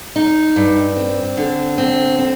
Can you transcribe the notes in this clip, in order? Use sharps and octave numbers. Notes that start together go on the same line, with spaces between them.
D#4
G2
C4
D3
C4
C4